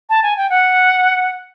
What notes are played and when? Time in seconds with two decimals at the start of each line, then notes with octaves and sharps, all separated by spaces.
0.10 A5
0.23 G#5
0.37 G5
0.50 F#5